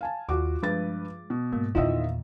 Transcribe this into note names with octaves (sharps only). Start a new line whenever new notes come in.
F5 G#5 A5
D#2 F4 F#4 D6
G2 F3 G#3 B4 A6
B2
G#2 A#3
E2 A#2 D#3 B3 E4 F4 D#5 E5